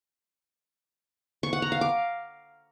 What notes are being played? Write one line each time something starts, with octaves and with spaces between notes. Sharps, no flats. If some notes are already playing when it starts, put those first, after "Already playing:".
C#6
F#5
A#5
F5
D6